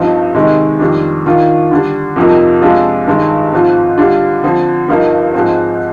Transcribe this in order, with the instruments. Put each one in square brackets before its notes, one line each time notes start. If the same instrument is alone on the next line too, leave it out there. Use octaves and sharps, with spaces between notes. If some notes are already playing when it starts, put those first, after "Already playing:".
Already playing: [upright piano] G2 F3 C4 D#4
C3 D#3 G#3 D#4
F2 D#3 G3 D4
D#3 A#3 D4 F4
D3 G3 D4
F2 C3 F3 A#3 D#4
C3 F3 G#3 D4 F4
G2 D#3 G#3
G#2 F3 C4 F4
D3 G3 D4 F4
D3 F3 C4
G2 F3 A#3 D#4
G#2 F3 G#3 C4